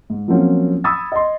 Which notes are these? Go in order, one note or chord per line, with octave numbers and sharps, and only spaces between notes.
G#2
F3 F#3 A#3 C4 C#4 F4
B5 C#6 D#6 E6 G#6 A6
D#5 C6